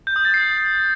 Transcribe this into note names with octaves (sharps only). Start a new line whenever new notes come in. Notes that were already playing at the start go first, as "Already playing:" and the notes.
G6
D#6
A6
C7